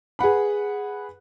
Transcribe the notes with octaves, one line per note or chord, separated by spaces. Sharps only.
G#4 B4 F#5 B5